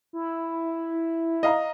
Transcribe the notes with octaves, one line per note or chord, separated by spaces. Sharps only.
E4
D#5 F5 A#5